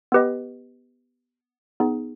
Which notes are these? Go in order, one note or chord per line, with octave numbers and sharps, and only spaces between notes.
B3 G4 B4 D#5
B3 D#4 G#4